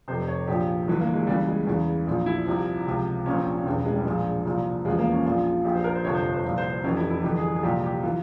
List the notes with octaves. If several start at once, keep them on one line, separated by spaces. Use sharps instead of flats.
F1 F2 C3 C5
C#5
A#1 A#2 F3 G4
G1 G2 E3
A#3
G#3
C#2 C#3 E3 G3
G#3
E2 C#3 E3
A#1 A#2 F3
E4
C2 C3 F3
C#2 C3 F3
A#1 A#2 F3 C#4
C4
C#4
C#4
E1 E2 C#3 E3 C4
G#3
G3
A#1 A#2 F3 G#3
C2 A#2 F3
E2 C#3 F3 G#3
A#3
C#4
A#1 A#2 F3 F4
A#1 A#2 F3 G4
C5
A#4
C5
G1 F2 C3 F3 C#5
C5
C#5
C5
C2 A#2 F3
C5
C5
F1 F2 C3 E3 C#4
E4
E4
G1 F2 E3 G4
G#4
G#4
C2 A#2 F3 G4
G4
E3 F4